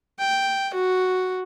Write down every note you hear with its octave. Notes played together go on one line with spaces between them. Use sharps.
G5
F#4